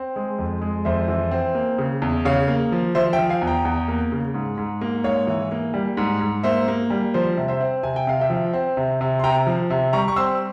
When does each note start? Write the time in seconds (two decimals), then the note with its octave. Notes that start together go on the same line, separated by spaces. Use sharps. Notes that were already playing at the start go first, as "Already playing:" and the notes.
Already playing: C4
0.16 G#3
0.39 F2
0.62 G#3
0.85 F2 C5 E5
1.08 E3
1.31 C4
1.55 A#3
1.78 C#3
2.02 E2
2.25 C#3 C#5 F5
2.48 A#3
2.72 F3
2.95 F3 C5 E5
3.13 E5 G5
3.19 F3
3.29 F5 G#5
3.42 E2
3.47 G5 A#5
3.65 E2
3.88 A#3
4.12 C#3
4.34 G#2
4.57 G#2
4.81 A#3
5.04 G#2 C#5 F5
5.27 E3
5.51 A#3
5.74 G3
5.97 G#2
6.21 G#2
6.44 A#3 C5 E5
6.68 A#3
6.90 G3
7.14 F3 C5
7.37 C3
7.48 C5 E5
7.60 C4
7.83 C3 G#5
7.96 G5
8.07 C3 F5
8.21 E5 G5
8.30 F3
8.54 C4
8.77 C3
9.01 C3
9.19 C6
9.24 C3 G5 A#5
9.47 F3
9.70 C3
9.93 G3 A#5 C#6
10.08 C#6
10.16 C4 C6 E6